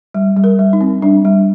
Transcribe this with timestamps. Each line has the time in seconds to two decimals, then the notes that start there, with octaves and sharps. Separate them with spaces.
0.14 G3
0.37 G3
0.44 A#4
0.59 G3
0.73 D#4
0.81 C4
1.02 G3 D4
1.25 G3